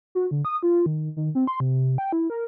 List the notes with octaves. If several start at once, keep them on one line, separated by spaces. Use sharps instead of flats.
F#4
D3
D#6
F4
D#3
D#3
C4
C6
C3
G5
E4
A#4